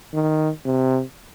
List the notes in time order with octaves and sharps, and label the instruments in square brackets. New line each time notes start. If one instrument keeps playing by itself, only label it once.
[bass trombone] D#3
C3